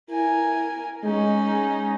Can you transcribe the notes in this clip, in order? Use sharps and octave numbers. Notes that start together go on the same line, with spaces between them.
E4 A#4 G#5
G#3 C#4 D#4